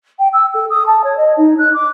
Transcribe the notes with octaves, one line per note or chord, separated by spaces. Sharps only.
G5
E6
A4
D#6
A5
C#5
D#5
D#4
F#6
D6